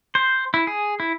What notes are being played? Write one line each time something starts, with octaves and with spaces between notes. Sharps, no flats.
C5
E4
G#4
E4